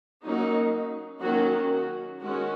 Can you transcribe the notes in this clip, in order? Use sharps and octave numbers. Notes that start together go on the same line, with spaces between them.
F#3 A#3 C#4 D#4
D#3 F#3 A#3 C#4 F#4
F#4
D#3 G#3 C#4 F#4